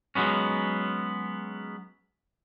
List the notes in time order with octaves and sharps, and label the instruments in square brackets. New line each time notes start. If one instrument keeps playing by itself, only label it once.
[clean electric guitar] F#3 G#3 B3 C#4